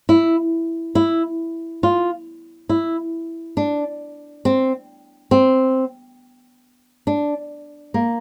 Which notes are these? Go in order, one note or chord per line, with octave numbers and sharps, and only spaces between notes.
E4
E4
F4
E4
D4
C4
C4
D4
A#3